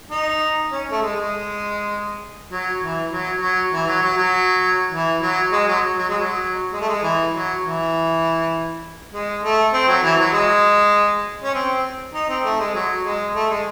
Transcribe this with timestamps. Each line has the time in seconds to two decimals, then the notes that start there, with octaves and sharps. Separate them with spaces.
0.11 D#4
0.71 C#4
0.91 A3
1.01 G#3
1.16 G#3
2.51 F#3
2.81 E3
3.12 F#3
3.41 F#3
3.72 E3
3.87 F#3
4.02 F#3
4.17 F#3
4.92 E3
5.22 F#3
5.52 G#3
5.67 F#3
5.97 F#3
6.09 G#3
6.20 F#3
6.73 G#3
6.80 A3
6.88 G#3
7.03 E3
7.33 F#3
7.63 E3
9.13 G#3
9.44 A3
9.73 C4
9.88 F#3
10.03 E3
10.19 F#3
10.33 G#3
11.43 C#4
11.54 C4
12.14 D#4
12.29 C4
12.45 A3
12.60 G#3
12.74 F#3
13.05 G#3
13.35 A3
13.50 G#3